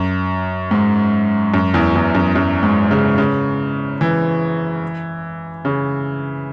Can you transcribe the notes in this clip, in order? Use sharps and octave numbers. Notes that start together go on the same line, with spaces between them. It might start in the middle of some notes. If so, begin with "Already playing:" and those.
Already playing: F#2
G#2
F#2
E2
E2
F#2
F#2
G#2
C#3
C#3
E3
C#3